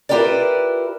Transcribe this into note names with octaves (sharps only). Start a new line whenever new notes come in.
E4 F4 G4 A#4 B4 D5